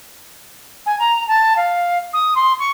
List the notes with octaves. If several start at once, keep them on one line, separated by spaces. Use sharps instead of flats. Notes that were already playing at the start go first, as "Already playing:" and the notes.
G#5
A#5
A5
F5
D#6
C6
C#6